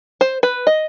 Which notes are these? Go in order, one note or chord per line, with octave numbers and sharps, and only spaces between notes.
C5
B4
D#5